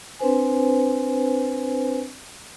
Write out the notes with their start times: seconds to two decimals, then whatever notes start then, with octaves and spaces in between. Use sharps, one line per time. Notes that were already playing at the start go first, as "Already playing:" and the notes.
0.19 C4 D4 B4 C5 G#5